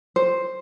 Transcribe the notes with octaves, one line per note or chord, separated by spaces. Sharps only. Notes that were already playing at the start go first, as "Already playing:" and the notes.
C5